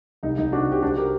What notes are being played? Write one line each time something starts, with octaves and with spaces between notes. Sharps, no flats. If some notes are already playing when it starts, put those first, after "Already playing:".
C2 D#4
C2 D#4
C3 D4 F#4
C3 G4
C2 D4 F#4
C3 G4 A#4